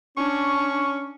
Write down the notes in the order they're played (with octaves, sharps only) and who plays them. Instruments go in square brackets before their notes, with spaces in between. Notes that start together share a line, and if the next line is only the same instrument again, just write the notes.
[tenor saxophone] C#4 [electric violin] D4 [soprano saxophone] C#6